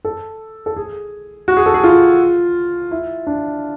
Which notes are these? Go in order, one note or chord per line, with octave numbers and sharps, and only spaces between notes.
A4
A4
G#4
F#4
G#4
A4
G#4
F4
E4
D4